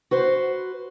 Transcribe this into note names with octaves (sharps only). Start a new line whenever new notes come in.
F#4 B4 C5